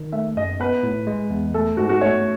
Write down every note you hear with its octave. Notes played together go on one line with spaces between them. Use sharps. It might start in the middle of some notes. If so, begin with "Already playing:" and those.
Already playing: D#3
A3 E5
F#2 D#5
B3 B4
A2
G#3
E2
A3 A4
G#2 F#4
F#4
A3 C#5